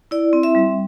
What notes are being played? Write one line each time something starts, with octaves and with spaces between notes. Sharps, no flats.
E4 D5
C4
E5
G3